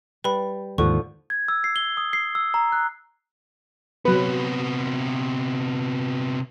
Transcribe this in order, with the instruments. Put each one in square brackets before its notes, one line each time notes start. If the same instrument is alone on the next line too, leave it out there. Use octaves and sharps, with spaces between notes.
[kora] G3 [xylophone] B4 B5
[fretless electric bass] D#2 G#2 [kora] D3 F3 [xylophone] C#6
[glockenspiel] G#6
E6
C7
G7
D#6
C7
E6
A#5
F#6
[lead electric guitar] C3 B3 [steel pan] F#3 B4